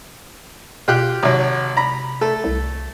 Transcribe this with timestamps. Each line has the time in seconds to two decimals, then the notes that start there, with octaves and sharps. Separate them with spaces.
0.88 B2 F4 G4 F#6
1.23 G#1 C3 F#3
1.77 A#5 B5
2.21 A3 A4
2.44 C2